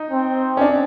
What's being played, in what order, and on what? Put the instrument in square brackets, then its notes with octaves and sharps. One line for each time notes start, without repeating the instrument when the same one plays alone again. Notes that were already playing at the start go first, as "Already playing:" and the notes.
Already playing: [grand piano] D#4
[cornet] C4
[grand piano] C#4
D4